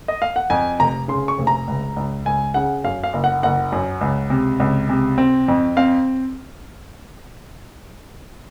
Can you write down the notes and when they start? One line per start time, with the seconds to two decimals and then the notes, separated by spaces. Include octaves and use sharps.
0.08 D#5
0.22 F5
0.36 F#5
0.50 F2 G#5
0.80 F1 A#5
1.08 C#3 C6
1.28 C#6
1.38 F1
1.47 A#5
1.68 C#2
1.96 C#2
2.25 C#2 G#5
2.54 C#3 F#5
2.84 F#2 F5
3.04 F5
3.13 F#1
3.24 F#5
3.43 F#1 F#5
3.72 F#2
4.01 C#2
4.30 C3
4.60 C#2
4.89 C3
5.18 C4
5.48 F2
5.77 C4 F5